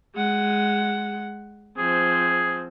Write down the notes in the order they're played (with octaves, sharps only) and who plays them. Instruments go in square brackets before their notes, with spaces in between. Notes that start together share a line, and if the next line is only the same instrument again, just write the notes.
[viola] G#3 F#5
[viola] F3 C4 [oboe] G#4